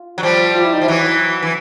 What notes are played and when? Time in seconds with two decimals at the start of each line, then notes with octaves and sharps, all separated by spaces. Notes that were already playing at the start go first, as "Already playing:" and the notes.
Already playing: F4
0.18 F#3
0.23 F3 G3
0.55 F4
0.64 E4
0.73 D#4
0.81 F3 E4
0.88 E3 F#3
1.42 E3